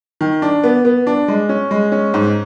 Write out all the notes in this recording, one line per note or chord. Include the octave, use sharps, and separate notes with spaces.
D#3
D4
B3
B3
D4
G#3
C#4
G#3
C#4
G#2